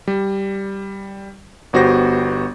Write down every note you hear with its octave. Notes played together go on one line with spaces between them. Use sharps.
G3
G1 B3 F#4 G4 C5 A#6